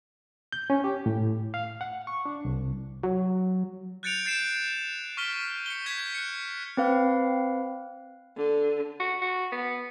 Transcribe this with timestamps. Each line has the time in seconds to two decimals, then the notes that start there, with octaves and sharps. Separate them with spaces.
0.52 G6
0.70 C#4
0.84 G4
1.06 A2
1.54 F5
1.81 F#5
2.07 C#6
2.25 D4
2.45 C2
3.03 F#3
4.03 F#6 G6 A6 C#7 D7 F7
4.26 G6 A6 C7 D7 E7
5.17 C#6 F6 B6 G7
5.66 C#7 G7
5.86 G6 G#6 B6
6.15 F#6 C#7
6.77 C4 B4 F5
8.37 D3
9.00 F#4
9.22 F#4
9.52 B3